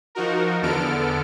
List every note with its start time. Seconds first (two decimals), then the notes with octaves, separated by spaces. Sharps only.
0.15 F3 D#4 F#4 A#4
0.62 E2 D3 B3 A4 F6 D7